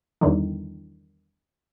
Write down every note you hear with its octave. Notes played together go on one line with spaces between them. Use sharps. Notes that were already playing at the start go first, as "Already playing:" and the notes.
E2 G2 D3 D#3